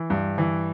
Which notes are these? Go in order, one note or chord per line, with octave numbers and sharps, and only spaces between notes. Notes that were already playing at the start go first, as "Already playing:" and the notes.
Already playing: E3
G2
E3